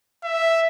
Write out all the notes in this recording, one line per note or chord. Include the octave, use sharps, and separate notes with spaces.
E5